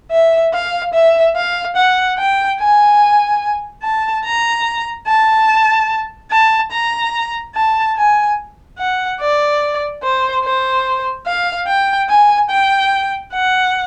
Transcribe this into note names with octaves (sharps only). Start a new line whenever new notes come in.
E5
F5
E5
F5
F#5
G5
G#5
A5
A#5
A5
A5
A#5
A5
G#5
F#5
D5
C5
C5
F5
G5
G#5
G5
F#5